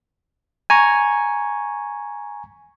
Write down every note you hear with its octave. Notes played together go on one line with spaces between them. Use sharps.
G#5 A#5 C#6